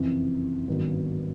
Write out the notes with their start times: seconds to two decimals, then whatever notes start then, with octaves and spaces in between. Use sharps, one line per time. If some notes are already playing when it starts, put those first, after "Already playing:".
Already playing: F#1 F2 C3 E3
0.67 G#1 G2 D#3 F#3 B3